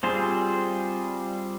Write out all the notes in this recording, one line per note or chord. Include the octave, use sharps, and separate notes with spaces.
G3 C4 F4 G#4 C5